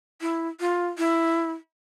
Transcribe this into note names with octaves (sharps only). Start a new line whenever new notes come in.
E4
F4
E4